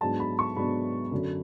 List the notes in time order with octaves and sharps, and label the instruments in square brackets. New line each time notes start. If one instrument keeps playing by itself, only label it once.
[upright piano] G#2 F#3 B3 D4 A5
B5
C#6
G#2 F#3 B3 D4 B5
F#2 D3 F#3 C#4